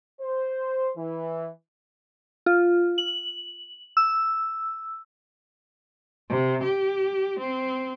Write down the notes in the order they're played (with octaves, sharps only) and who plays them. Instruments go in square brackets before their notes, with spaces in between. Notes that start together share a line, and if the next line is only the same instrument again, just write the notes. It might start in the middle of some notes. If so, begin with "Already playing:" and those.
[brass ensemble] C5
E3
[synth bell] F4
F#7
E6
[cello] C3
G4
C4